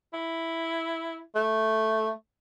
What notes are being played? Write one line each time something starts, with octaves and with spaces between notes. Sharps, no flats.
E4
A3